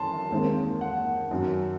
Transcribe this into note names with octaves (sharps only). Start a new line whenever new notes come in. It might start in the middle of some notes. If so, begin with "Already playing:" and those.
Already playing: F#2 E3 A5 C6
D#2 D#3 G#3 C4
F#5
F#2 D#3 F#3